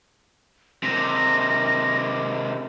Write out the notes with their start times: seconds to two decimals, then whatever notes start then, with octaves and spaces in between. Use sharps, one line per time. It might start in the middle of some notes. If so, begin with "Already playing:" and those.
0.84 C3 D#3 A#6